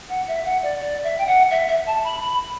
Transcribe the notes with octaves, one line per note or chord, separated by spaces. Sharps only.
F#5
E5
F#5
D5
D5
E5
G5
F#5
E5
E5
A5
B5
B5